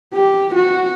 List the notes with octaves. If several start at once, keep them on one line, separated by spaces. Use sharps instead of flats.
G4
F#4